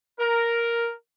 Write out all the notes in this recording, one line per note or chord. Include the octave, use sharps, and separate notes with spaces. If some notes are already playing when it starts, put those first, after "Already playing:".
A#4